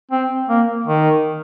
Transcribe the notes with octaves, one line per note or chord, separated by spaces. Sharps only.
C4
A#3
D#3